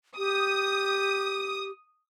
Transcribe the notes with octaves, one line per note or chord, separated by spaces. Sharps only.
G4 D#6